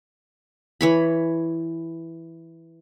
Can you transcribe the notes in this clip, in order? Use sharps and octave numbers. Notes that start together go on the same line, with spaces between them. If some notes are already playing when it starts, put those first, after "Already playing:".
E3 C#5 B5